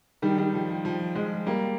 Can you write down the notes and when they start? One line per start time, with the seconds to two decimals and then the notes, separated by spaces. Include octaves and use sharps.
0.22 D#3 G3
0.38 D#3 G3
0.54 F3
0.69 F3
0.85 F3
1.15 F3 G#3
1.46 G3 A#3